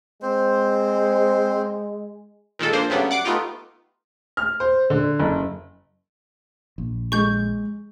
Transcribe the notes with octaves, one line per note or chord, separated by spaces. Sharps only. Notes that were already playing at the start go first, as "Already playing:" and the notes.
G#3 C4 C5
A#2 D#3 G#3 A4
F3 A#3 D4 C5
G2 C#3 F#3 G3 A3 B3
F#5 D6 C7 D7
A3 B3 D#4 F4 G4
F6
C5
D3
F#1
A#1
G#3 C#6 G6